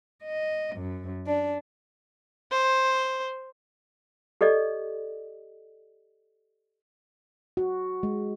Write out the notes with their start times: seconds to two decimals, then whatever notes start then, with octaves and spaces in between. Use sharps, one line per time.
0.25 D#5
0.78 F#2
1.27 D4
2.51 C5
4.41 G4 A4 D5 D#5
7.57 F#4
8.03 G#3